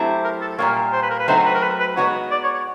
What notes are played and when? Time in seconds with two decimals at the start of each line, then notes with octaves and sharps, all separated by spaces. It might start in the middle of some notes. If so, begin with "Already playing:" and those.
Already playing: F#3 A3 C4 E4 G4
0.24 A#4
0.41 A4
0.58 A#2 G3 A#3 C#5
0.93 C5
1.03 B4
1.10 A#4
1.19 B4
1.28 F#3 A3 C4 D#4 F#4 C5
1.45 B4
1.54 A#4
1.63 B4
1.80 B4
1.97 G#3 B3 D#4 F#4 B4 C#5
2.31 D5
2.43 C#5
2.54 C#5